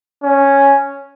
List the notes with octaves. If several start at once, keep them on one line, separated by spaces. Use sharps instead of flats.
C#4